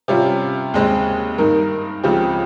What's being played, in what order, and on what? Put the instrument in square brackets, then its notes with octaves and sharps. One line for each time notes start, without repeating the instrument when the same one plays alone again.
[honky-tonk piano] C3 G3 C#4 F4
D#2 C#3 G#3 C4
G2 D#3 A#3 D#4 A#4
C#2 C#3 F3 C4 G4